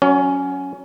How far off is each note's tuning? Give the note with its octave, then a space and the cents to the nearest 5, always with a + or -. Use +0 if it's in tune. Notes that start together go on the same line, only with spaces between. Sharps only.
F#3 +0 C#4 +5 C#5 +40